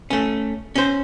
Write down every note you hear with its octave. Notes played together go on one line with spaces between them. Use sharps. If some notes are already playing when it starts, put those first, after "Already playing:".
A3 C#4
C#4 C5